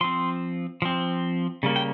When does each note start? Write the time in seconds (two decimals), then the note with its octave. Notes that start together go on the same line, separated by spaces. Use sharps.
0.01 F3 C4 C6
0.82 F3 C4
1.63 C#3 G3 A#3
1.76 G5